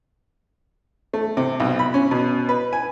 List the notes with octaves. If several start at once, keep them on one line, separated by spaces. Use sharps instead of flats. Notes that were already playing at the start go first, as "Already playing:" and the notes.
A3
C3
B1
B5
C#4
B2
B4
G#5